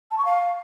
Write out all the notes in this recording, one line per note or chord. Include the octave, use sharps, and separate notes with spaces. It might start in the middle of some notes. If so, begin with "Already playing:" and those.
A5
C#6
F5